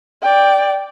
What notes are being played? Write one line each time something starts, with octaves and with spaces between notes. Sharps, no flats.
D5 G5